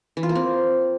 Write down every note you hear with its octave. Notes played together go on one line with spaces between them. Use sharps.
E3
F4
A#3
C4